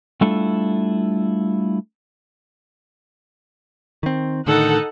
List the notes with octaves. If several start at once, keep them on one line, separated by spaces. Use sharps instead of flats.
G3 A3 D4 E4 F4 A4
D#3 C4
A2 D3 D#3 D#4 A4 F#5